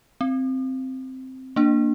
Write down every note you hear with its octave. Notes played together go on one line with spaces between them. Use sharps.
C4
A#3 D4